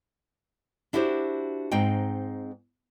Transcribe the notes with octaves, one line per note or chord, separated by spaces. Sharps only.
D4 E4 F#4 G4 B4 C5
G#2 C4 D#4 G5